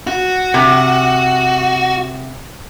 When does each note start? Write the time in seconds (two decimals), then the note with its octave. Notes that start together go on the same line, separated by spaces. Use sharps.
0.07 F#4
0.54 C3